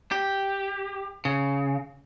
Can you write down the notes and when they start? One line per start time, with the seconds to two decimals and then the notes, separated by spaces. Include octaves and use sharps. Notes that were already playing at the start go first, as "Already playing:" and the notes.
0.12 G4
1.25 C#3